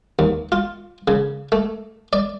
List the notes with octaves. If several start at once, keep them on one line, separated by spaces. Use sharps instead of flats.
D#2
F4
C#3
A3
D5